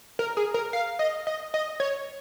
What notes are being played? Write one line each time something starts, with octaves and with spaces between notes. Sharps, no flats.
A#4
G#4
A#4
F5
D#5
D#5
D#5
C#5